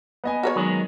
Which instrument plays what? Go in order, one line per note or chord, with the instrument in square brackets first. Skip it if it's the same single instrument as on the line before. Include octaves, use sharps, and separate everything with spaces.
[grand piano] B3 D#5 G#5
[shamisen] F#4 B4 C#5
[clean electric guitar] D#3 F#3 G#3